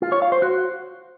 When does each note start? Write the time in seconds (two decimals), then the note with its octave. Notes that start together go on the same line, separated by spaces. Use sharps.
0.02 F4
0.12 C#5
0.22 F5
0.32 C5
0.42 F#4